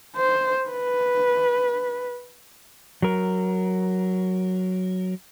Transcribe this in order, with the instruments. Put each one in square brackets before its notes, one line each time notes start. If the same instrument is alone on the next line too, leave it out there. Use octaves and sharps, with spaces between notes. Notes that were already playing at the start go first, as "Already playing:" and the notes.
[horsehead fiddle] C5
B4
[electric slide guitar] F#3 A#4